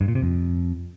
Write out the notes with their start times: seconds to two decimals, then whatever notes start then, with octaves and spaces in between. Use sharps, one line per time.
0.01 G2
0.08 A#2
0.15 C3
0.23 F2